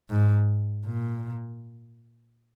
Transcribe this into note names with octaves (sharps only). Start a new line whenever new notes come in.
G#2
A#2